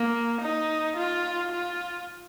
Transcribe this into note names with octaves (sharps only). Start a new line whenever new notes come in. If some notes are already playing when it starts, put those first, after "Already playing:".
Already playing: A#3
D#4
F4
F4